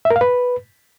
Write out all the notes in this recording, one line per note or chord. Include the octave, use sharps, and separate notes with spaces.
E5
A#4
F5
B4